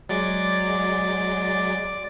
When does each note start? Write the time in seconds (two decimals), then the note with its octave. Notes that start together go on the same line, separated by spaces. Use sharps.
0.09 F#3 G#3 D5 D6